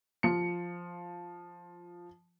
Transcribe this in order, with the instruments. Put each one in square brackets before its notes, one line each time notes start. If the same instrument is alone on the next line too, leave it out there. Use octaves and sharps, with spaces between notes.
[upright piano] F3 C#7